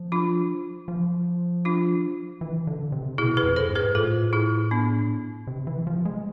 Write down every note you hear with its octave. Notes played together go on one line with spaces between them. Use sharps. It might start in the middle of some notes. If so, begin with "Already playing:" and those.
Already playing: F3
D4 F4
F3
D4 F4
E3
D3
C3
B2 E4 G#4
G#4 B4
F2
A4 C5
G#2
G#4 B4
A2 F4 A4
E4 G#4
B3 D4
C3
E3
F3
G#3